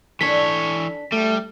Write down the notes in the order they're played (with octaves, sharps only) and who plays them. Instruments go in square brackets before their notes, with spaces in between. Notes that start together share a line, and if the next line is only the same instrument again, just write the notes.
[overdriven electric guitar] E3 C#5 [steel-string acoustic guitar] D4 A4 [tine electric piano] B6
[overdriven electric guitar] G3 [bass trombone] A3